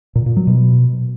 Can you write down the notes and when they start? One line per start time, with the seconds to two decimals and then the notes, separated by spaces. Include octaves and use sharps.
0.16 A#2
0.26 A#2
0.37 F#3
0.47 B2